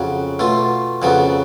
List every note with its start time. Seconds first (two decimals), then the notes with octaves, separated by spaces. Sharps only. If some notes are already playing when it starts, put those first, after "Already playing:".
Already playing: F2 C#3 F#3
0.39 B2 A3 F4
1.02 F2 C#3 F#3 B3